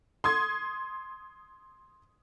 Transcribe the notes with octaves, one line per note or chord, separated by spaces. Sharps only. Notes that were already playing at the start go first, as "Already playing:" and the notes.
C6 D#6 G#6